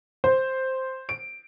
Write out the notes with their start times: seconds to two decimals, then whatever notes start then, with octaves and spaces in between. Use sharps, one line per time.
0.24 C5
1.09 D7